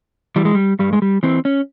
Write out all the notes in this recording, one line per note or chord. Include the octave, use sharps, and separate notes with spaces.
E3 G3
G#3
G3
G2 G3
G#3
G3
E3 C4
C#4